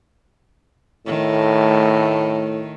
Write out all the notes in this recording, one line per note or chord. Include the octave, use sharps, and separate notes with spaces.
A2 D#3 A3